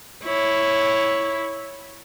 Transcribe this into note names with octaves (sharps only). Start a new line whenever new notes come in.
E4 C#5